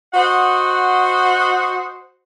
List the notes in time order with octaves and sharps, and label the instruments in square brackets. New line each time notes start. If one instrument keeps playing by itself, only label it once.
[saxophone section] F#4 C5 D#5 F#5